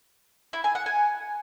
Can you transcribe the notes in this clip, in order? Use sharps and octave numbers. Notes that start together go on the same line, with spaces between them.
E4
G#5
F#5
G#5